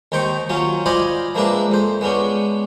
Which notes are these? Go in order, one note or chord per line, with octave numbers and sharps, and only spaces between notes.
D#2 D#3 D#4 C5 G5 C#6
F#3 C#4 F4
F4 C5 D5 D#5 G#5 B5
F3 G#3 A#3 D4 B4 E5
F2 C5
G#3 B3 C#4 D4